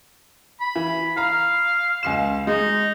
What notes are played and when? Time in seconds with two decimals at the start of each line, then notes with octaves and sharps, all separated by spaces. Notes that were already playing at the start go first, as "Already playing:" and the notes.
0.60 B5
0.76 E3
1.17 F5 A#5 B5
2.03 C#2 C7 E7
2.47 G#3 D#4